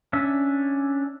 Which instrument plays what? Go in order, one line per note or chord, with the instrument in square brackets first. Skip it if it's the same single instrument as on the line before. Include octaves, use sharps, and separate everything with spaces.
[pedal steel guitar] C#4 D4 E5